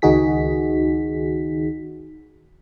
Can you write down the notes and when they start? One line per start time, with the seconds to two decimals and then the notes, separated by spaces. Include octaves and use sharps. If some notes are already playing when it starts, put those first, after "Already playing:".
0.02 C#2 D#3 D#4 F#4 G#4 B6